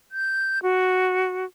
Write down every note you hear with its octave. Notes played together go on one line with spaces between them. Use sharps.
G6
F#4